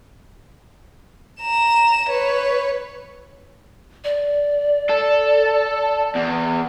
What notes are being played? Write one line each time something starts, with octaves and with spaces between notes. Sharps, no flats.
A#5 E7
B4 C#5
D5
A4
E2